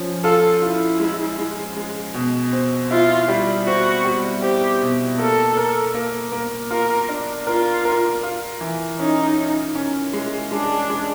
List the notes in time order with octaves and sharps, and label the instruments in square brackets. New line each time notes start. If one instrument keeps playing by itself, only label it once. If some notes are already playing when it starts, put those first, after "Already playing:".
Already playing: [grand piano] F3 C#4
[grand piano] F4 [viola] A4
[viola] E4 [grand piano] F4
[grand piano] G#3
G#3
G#3
B2
C4
[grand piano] E4 [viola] F4
[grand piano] G3
[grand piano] C4 [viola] F#4
[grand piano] G3
[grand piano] C4 [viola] G4
[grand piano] B2
[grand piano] A#3 [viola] A4
[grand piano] A#4
A#3
A#3
[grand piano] F4 [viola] A#4
[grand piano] D4
[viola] F4 [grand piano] A#4
[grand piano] A#4
F4
E3
[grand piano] C#4 [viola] D#4
[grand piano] C#4
C#4
G#3
[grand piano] G#3 [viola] D4
[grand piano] G#3